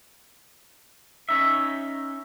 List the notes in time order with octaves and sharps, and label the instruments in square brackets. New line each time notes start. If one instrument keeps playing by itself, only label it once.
[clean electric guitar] C#4 D#4 E5